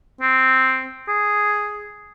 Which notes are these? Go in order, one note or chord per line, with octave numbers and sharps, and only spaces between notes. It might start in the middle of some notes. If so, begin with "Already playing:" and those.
C4
G#4